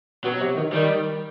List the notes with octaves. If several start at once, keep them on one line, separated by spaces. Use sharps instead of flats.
B2 F#3
C3
D#3
D#3 G3